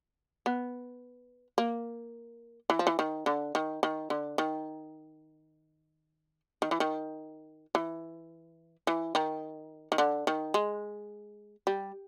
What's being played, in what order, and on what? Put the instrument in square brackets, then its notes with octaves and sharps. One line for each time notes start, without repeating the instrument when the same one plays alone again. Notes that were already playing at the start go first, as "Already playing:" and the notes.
[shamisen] B3
A#3
E3
F3
E3
D#3
D3
D#3
D#3
D3
D#3
D#3
E3
D#3
E3
E3
D#3
D#3
D3
D#3
G#3
G3